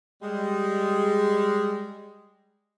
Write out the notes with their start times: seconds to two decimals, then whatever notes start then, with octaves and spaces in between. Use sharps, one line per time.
0.22 G3 G#3